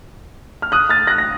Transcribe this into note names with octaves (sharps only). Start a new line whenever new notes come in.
F6
D#6 F#6
F6 A6
F#6 A#6
A#6